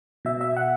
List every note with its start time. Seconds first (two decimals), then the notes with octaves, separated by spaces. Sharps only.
0.25 B2 E5
0.41 E5
0.57 F#5